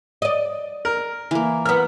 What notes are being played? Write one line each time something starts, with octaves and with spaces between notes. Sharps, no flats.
D5 D#5
A#4
E3 A#3
B3 A#4 F6